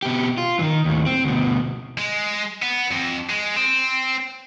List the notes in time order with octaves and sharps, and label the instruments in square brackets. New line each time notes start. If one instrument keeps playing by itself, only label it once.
[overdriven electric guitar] B2 G4
F4
D#3 E3
D#2 A2
C4
D2 B2
[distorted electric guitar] G#3
B3
F2
G#3
C4